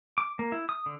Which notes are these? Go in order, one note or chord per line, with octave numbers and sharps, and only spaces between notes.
D6
A#3
E4
D#6
D3